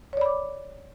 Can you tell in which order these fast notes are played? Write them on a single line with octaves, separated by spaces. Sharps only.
C#5 D5 B5 D6